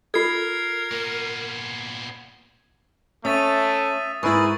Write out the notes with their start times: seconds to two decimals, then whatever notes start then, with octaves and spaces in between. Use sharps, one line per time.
0.14 F4 A4 A#4 G#6 C7
0.91 A#2 B3
3.25 A3 C#4 E5 D#6 A6 D#7
4.23 G#2 E4 G#4 A#4 B4 C#6 E6 A6